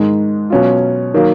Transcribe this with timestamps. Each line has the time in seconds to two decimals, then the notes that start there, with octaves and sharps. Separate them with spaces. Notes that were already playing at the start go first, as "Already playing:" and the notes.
Already playing: G#2 D#3 G#3
0.50 B2 F#3 C#4 F4
1.14 D#3 F#3 A#3